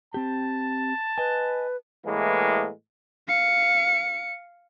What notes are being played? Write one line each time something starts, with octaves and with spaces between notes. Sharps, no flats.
C4 G4 A5
B4 D#5 G#5
A2 E3 G#3 A#3 B3
F5 C#7